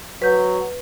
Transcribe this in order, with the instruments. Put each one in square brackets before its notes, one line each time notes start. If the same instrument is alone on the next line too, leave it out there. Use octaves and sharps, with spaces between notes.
[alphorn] F#3 [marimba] B4 G6